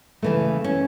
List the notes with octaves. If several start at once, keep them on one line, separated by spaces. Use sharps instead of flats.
C#3 E3 A3
C#4